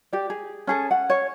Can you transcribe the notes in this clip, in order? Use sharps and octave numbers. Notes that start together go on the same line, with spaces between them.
G4 D5
G#4
C#4 G#4 A4
F#5
C#5